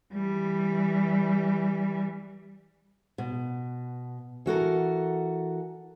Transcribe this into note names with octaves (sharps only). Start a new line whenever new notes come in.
E3 G3
B2
E3 F#4 A4 A#4